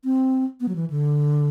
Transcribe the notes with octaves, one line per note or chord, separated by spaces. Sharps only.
C4
B3
F#3
E3
D3